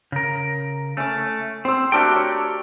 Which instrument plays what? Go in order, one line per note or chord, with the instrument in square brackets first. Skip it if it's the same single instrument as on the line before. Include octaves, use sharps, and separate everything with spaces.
[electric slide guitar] C#3 A#4
[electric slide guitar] A3 [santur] C#4 D6
[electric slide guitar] C4 [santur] C5 E6
[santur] A3 D4 F#4 [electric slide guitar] G4 A#4 G5
[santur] C#5